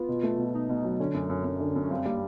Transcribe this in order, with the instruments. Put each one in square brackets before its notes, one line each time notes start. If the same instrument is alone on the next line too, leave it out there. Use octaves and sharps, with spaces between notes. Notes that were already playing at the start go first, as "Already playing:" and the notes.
Already playing: [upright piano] B3 [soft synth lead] F4
[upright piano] B2
A3
B2
[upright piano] B2 [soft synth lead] D#4
[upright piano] B2
F#3
[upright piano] D3 [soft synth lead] C#4
[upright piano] F#2
F#2
F#2
D3
F#2
[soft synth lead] C#4
[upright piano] G2 [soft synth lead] C4
[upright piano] G3 [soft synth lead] A#3